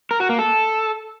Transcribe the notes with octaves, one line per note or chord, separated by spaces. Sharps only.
A#4
F#4
A#3
A4